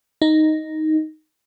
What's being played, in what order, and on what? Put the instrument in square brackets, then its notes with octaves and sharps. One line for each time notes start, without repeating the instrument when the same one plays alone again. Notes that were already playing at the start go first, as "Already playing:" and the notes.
[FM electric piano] D#4